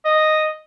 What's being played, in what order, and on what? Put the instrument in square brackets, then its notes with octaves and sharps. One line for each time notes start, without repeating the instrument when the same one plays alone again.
[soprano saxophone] D#5